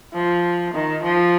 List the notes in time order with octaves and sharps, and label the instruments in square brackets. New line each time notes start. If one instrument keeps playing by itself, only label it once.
[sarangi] F3
D#3
F3